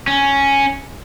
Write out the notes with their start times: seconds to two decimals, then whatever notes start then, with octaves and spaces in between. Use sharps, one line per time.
0.08 C#4